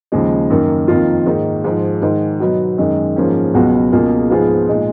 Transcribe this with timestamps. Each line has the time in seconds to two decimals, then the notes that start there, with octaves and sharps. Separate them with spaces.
0.12 D#2 C#3 F3 G#3
0.50 F#2 D#3 A#3
0.88 F2 D#3 A#3 F4
1.26 G#2 D#3 A#3 D#4
1.64 G#2 F3 G#3
2.02 G#2 D#3 G#3
2.40 B2 F#3 B3 D#4 F#4
2.78 F#2 D#3 G#3 D#4
3.16 G#2 F3 A#3 C#4 G#4
3.54 C#2 B2 F#3 B3 F#4
3.92 C#2 B2 A#3 F4 G#4
4.30 G#2 F3 B3 F4 G#4
4.68 A#2 G#3 D#4